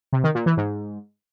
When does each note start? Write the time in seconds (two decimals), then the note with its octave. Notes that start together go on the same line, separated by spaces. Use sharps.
0.13 C3
0.24 D#3
0.35 A#2
0.46 E3
0.57 G#2